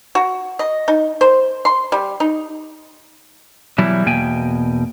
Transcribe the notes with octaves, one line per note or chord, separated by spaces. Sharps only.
F#4
D#5
D#4
C5
C6
G3
D#4
B2 E3 F#3 G3 E4
E2 B2 A#3 G5 G#5